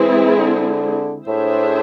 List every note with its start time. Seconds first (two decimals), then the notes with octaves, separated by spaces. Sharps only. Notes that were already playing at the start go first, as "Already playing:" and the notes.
Already playing: E3 G#3 C4 E4 G#4
0.37 D3
1.27 A2 D4 G#4 C5 E5